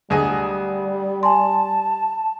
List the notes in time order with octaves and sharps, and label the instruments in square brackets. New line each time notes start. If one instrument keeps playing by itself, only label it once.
[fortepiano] D2 G#4 D#5 [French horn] G3
[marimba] G#5 C6 [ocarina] A5